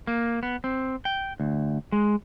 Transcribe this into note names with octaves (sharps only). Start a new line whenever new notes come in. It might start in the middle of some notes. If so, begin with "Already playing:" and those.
A#3
B3
C4
G5
D2
G#3